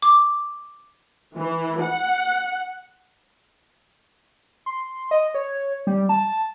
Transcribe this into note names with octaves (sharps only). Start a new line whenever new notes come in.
D6
E3
F#5
C6
D#5
C#5
G3
A5